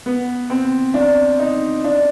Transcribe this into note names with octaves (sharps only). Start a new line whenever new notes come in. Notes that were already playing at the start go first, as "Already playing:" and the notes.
B3
C4
D4
D#4
D4